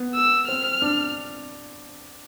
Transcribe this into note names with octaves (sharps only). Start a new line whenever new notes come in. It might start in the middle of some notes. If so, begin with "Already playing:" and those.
Already playing: B3
E6
C4 F6
D4